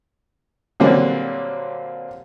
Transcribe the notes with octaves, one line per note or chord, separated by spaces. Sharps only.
A#2 D3 F#3 G3 A#3 C4